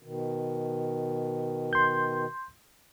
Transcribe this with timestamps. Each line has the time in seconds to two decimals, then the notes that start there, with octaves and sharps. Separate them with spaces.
0.03 B2 D#3
1.73 C6 G6